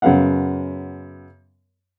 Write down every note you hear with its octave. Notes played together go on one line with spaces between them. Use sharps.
F#2 C#3 B3 F5 F#5